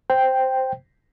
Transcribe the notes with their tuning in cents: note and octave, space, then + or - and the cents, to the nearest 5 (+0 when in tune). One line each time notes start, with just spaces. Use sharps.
C5 +0 G5 +0